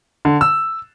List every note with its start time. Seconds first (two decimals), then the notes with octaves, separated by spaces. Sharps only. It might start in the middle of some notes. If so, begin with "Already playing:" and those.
0.25 D3
0.41 E6